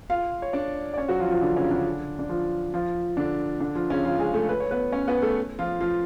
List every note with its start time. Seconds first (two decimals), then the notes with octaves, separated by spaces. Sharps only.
0.10 F4 F5
0.42 C#5
0.53 D4 D5
0.94 D5
0.97 C#4 C#5
1.08 F#3 F#4
1.20 F3 F4
1.30 F3 F4
1.42 D3 D4
1.56 C#3 C#4
1.71 D3 D4
2.19 D4
2.29 F3 F4
2.74 F3 F4
3.17 D3 D4
3.60 D3 D4
3.75 F3 F4
3.90 C#3 C#4
4.05 F3 F4
4.19 G#3 G#4
4.34 A3 A4
4.49 B4
4.60 C#5
4.71 B3 B4
4.92 C#4 C#5
5.08 B3 B4
5.22 A3 A4
5.59 F3 F4
5.80 F3 F4